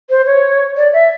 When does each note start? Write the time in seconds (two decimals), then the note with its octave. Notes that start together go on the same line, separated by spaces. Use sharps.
0.10 C5
0.26 C#5
0.77 D5
0.93 E5